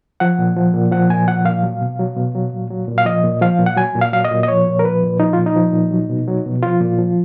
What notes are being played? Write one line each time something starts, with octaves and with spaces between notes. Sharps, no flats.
F3 F#5
A#2
F3
A#2
F3 F#5
A#2 G#5
F3 F#5
A#2 F5
F#3
B2
F#3
B2
F#3
A#2
F#3
A#2
F5
F3 D#5
A#2
F3 F5
A#2
F#5
F#3 G#5
A#2
F5
F#3 F5
D#5
A#2
D#5
F3 C#5
A#2
A#4
F3 B4
A#2
F3 D#4
A#2 F4
D#4
F3
A#2
F#3
B2
F#3
B2
F3 F4
A#2
F3